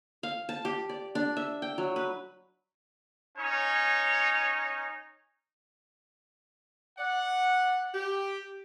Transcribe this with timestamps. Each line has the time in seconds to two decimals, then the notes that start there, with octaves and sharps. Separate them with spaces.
0.23 F5
0.49 A5
0.65 G4
0.89 D5
1.15 D4
1.37 E5
1.62 G5
1.78 F#3
1.96 B4
3.38 C#4 D#4 C#5
6.99 D5 F#5
7.94 G4